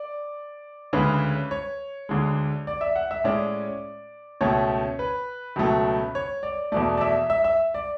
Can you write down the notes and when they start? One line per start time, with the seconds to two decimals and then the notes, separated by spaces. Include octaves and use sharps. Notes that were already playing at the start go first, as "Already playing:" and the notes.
Already playing: D5
0.93 D2 C#3 G#3 C#4 B4
1.51 C#5
2.09 D2 D3 G#3
2.67 D5
2.81 E5
2.96 F#5
3.11 E5
3.24 A2 G#3 C#4 D5
4.41 C#2 B2 A3 C#4 C#5
4.99 B4
5.56 C#2 B2 F#3 A3
6.15 C#5
6.43 D5
6.72 E2 B2 A3 D5
6.97 D5
7.01 E5
7.30 E5
7.44 E5
7.74 D5